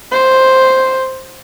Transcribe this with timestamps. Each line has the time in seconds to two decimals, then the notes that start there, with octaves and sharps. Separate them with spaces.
0.12 C5